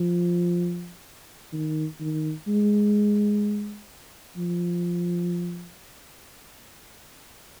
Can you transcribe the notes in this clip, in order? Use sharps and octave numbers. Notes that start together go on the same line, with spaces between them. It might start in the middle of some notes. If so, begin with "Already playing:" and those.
Already playing: F3
D#3
D#3
G#3
F3